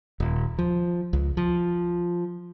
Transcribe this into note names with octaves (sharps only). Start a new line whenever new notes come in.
D#1
F3
C#2
F3